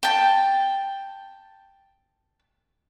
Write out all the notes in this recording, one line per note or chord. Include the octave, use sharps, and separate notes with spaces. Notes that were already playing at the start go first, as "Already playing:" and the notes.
G5 A5